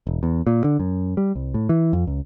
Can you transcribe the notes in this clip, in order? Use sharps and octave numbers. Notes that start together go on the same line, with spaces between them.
E1
E2
A#2
D3
F#2
G3
C2
A2
E3
F2
C#2